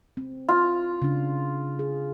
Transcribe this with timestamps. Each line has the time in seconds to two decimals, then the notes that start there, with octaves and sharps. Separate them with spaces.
0.17 C4
0.49 F4
1.02 C#3 D4
1.79 G#4